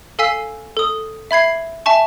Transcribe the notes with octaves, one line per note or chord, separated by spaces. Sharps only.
A4 F5 G#5 E6 B6 C7
A4 D#6
E5 B5 G#6 C7
E5 G#5 A5 C#6